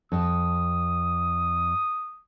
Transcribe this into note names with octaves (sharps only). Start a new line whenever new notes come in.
F2 D#6